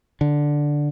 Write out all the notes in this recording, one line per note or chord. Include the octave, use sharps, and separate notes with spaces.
D3